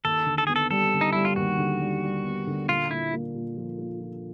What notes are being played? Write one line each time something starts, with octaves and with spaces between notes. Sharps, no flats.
D#2 A4
D3
A4
B3 G#4
A4
G3 A4
D3
D#4
G3 E4
F4
D#2 F#4
D3
G3
G3
B3
D3
A#2 F4
A#2 E4
A#3
A#2
F3
A#3
F3